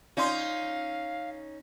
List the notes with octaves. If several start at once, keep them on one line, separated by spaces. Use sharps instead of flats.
C#4 D#4 F4 D5 F5 C6